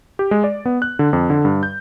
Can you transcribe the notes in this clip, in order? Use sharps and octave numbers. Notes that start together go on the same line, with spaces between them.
G4
G#3
D5
B3
F#6
D3
F2
D3
G2
G6